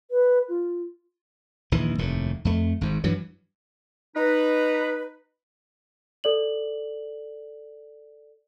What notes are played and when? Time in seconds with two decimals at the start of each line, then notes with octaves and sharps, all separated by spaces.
0.11 B4
0.49 F4
1.72 A#1 D#2 E3
1.99 F1 D#2 A2
2.45 F2 A3
2.81 G#1 G#2
3.04 G2 E3 F#3
4.16 D#4 B4
6.24 A4 D5 F#7